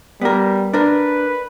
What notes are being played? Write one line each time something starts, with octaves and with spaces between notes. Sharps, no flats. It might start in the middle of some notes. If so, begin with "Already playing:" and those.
G3 B3 A#4
D4 A#4 B4